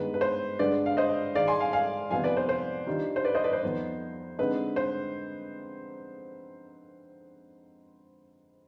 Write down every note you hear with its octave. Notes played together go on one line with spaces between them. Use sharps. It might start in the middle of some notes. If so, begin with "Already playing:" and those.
Already playing: G2 D#3 G#3 B3 B4
B4
C5
G2 D3 G#3 D4 B4 D5
F5
C5 D#5
G#2 D#3 G#3 D5 F5
G#5 C6
F5 G#5
F5 G#5
F2 C3 D#3 B3 F4 F5 G#5
B4 D5
C5
C5
D#3 G3 D4 F4
C5
B4 D5
C5 D#5
B4 D5
C5
F2 D#3 B3
D3 G#3 C4 D#4 B4
C5